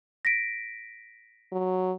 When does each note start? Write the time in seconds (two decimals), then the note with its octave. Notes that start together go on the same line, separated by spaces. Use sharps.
0.25 A#6 B6 D7
1.52 F#3